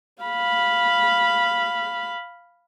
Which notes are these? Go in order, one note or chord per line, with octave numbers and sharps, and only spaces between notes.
F5 B5